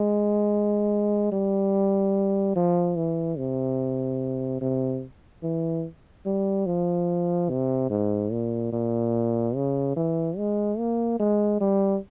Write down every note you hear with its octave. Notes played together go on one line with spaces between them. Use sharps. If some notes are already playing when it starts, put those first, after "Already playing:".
Already playing: G#3
G3
F3
E3
C3
C3
E3
G3
F3
C3
G#2
A#2
A#2
C#3
E3
G#3
A#3
G#3
G3